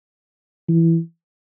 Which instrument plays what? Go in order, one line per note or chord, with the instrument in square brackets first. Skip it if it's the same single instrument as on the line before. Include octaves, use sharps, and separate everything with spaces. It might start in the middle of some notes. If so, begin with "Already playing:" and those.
[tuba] E3